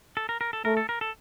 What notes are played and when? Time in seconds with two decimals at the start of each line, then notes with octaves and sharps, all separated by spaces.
0.17 A4
0.29 A#4
0.41 A#4
0.53 A4
0.65 A3 A#4
0.77 A4
0.89 A#4
1.01 A4